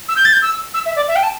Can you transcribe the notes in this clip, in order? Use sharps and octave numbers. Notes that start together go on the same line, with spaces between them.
E6
G6
A6
G6
E6
E6
E5
D5
E5
G5
A5